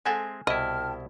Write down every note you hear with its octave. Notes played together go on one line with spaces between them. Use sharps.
G#3 C4 A4 E5 F#5 G#5
C2 B2 E4 D#5 G5 A5 F6